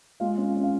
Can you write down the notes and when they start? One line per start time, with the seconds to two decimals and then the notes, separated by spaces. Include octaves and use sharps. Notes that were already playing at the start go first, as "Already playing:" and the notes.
0.20 G#3 F4 F5
0.38 C#4
0.56 C#4
0.63 F5